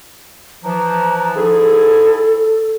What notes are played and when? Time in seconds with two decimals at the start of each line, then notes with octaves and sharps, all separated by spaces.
0.64 E3 F3 A#5
1.36 G#2 E4 G#4 A4